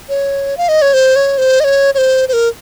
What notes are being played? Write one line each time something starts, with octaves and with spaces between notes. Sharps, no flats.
C#5
F5
D#5
C#5
C5
C#5
C5
D#5
C#5
C#5
C5
C5
A#4